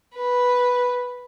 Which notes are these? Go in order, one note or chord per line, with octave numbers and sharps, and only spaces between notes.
B4